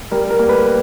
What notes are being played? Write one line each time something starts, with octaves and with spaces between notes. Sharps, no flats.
G3 A#4
A#4
A#3
B4